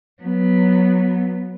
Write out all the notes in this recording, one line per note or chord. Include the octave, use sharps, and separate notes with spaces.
F#3 B3